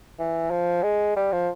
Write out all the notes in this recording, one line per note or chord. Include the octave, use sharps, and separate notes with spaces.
E3
F3
G#3
G3
F3